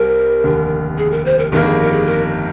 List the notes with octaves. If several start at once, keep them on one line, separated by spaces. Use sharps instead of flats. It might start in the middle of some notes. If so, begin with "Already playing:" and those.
Already playing: C2 C3 G3 C4 G4 A#4
F1 D#2 D3
G#4
A#4
C5
A#4
G1 F2 D#3 G3 A#3 A#4
G#4
A#4
G#4
A#4